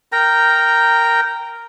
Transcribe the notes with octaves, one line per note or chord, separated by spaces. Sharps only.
A#4 G5 A#5